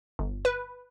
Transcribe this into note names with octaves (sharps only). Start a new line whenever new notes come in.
G1
B4